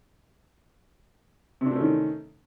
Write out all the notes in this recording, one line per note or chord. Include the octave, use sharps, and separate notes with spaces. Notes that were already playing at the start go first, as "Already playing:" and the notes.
C3 D#3 A3 C#4 D4